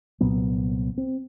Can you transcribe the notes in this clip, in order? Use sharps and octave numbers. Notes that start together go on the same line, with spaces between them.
C2 A#2 F#3 B3
C4